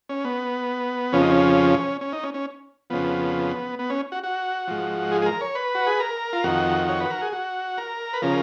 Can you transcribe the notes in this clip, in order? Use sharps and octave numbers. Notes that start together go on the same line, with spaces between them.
C#4
B3
F2 C#3 F3 C#4
D#4
C#4
C#4
D#4
C#4
C#4
F2 C#3 F3 B3
B3
C#4
F#4
F#4
G#2 F3
G#4
G#4
A#4
C#5
B4
F#4
G#4
A#4
F4
F2 D#3 F#4
C#5
B4
A#4
G#4
F#4
A#4
B4
C#3 F3 A#4